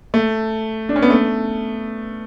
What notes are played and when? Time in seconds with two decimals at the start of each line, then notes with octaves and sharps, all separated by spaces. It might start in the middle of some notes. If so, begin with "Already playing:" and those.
0.14 A3
0.89 D4
0.96 C#4
1.02 B3
1.10 A3